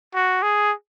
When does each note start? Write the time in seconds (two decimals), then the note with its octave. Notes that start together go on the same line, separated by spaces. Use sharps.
0.15 F#4
0.43 G#4